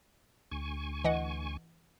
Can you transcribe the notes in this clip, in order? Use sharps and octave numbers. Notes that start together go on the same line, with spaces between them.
D2 G#5 C#6
E3 D#5 F#5